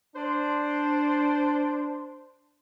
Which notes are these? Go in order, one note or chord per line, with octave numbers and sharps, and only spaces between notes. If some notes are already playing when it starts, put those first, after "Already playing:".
D4 C5